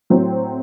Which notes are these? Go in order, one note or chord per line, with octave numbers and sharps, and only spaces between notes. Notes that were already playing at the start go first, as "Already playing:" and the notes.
A2 F#3 C4